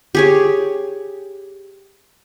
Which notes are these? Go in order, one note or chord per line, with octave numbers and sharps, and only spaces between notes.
G4 G#4 C#5